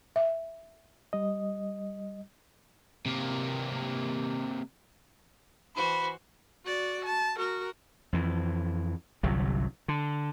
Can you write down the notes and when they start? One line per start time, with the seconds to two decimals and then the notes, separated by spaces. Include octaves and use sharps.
0.16 E5
1.13 G3 D#5
3.06 C3 A#3
5.76 E3 F#4 C5 B5
6.65 F#4 D5
7.05 A5
7.36 F#4 A#4
8.13 F2 E3
9.23 G1 C2 C3 F#3
9.88 D3